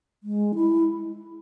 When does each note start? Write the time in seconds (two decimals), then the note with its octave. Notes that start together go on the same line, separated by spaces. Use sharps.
0.23 G#3
0.55 E4